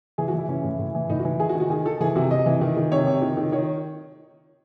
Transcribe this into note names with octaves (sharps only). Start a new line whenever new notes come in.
E3 G#4
F#4
E3 E4
E3 C#4
A2
A2
E3
A2 D#4
F#4
E3
D#3 G#4
F#4
D#3
F#4
D#3 G#4
D#3 A4
E3 G#4
C3 F#4
C3 D#5
E3
D#3
D#3
C3 C#5
C3
D#3
D#3
D#3 C#5